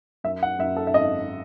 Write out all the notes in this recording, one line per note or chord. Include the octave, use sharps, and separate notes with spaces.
F#2 E5
F#5
F#2 E5
A4
E5
G#1 D#5